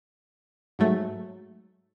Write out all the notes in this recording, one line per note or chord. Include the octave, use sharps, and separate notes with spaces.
G#2 F#3 A3